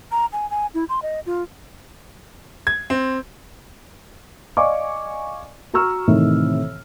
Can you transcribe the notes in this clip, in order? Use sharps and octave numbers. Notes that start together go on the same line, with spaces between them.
A#5
G#5
G#5
E4
C6
D#5
F4
G#6
C4
D5 D#5 F5 G#5 C#6 D6
F#4 A#5 C#6 E6 F6
A2 C3 D#3 E3